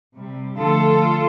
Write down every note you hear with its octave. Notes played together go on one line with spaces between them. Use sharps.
C3 G3
D3 F3 A3 F4 A4